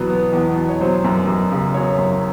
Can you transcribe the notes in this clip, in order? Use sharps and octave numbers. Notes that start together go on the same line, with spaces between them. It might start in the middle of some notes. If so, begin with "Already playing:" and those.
Already playing: E2 B2 F#3 B4
B3
E2
B2
C#5
F#3 C5
F#2
F#2
C#3
F#3 C#5
F#2